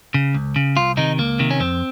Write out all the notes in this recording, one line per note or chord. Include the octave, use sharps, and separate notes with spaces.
C#3
C#2
C#3
C2 F4
C3 D#3 D#4
C#2 A#3
C3 D#3
C#4
F2 C4